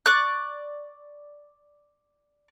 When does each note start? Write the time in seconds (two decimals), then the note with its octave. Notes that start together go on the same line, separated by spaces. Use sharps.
0.06 D5 C#6 F#6